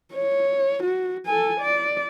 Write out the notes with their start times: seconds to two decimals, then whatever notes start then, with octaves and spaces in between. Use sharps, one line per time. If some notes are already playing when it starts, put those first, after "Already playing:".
0.13 C#5
0.83 F#4
1.26 A4 G#5
1.61 D5